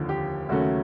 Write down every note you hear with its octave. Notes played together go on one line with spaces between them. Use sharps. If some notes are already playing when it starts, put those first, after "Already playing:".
Already playing: F1 D#2 D3 F3
G4
D#2 C#3 F#3 A3 C#4 F#4